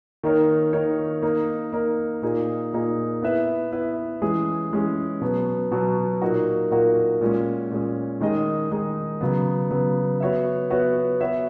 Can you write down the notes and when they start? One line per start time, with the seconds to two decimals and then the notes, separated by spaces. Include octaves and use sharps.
0.23 D#3 A#3 D#4 A#4 C#5
0.73 D#3 A#3 D#4 A#4 C#5
1.22 A#3 D#4 A#4
1.72 A#3 D#4 A#4
2.22 A#2 A#3 D#4 G#4
2.73 A#2 A#3 D#4 G#4
3.22 B3 E4 B4 E5
3.72 B3 E4 B4 E5
4.22 E3 G#3 C#4 G#4
4.72 E3 G#3 C#4 G#4
5.21 B2 F#3 B3
5.72 B2 F#3 B3
6.21 A#2 A#3 D#4 F#4 A#4
6.71 A#2 A#3 D#4 F#4 A#4
7.21 A#2 G#3 C#4
7.71 A#2 G#3 C#4
8.21 D#3 G#3 D#4 G#4 D#5
8.71 D#3 G#3 D#4 G#4 D#5
9.21 C#3 F#3 B3
9.70 C#3 F#3 B3
10.20 B3 F#4 C#5 E5
10.70 B3 F#4 C#5 E5
11.21 B3 F#4 C#5 E5